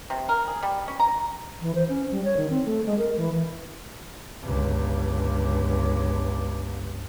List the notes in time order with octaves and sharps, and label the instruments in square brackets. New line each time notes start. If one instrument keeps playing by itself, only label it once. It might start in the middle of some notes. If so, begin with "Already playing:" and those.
[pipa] C3
A#4
G#4
G3
C#4
A#5
[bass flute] E3
C5
C#4
G3
C#5
D#3
C4
A3
G#3
A#4
E3
[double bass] G1 C#2